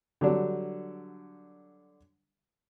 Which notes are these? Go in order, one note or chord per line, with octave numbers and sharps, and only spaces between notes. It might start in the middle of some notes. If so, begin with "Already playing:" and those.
D3 F#3 G3 D4